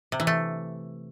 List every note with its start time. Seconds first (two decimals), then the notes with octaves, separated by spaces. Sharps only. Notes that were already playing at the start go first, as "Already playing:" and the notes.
0.12 C3
0.20 E3
0.27 A3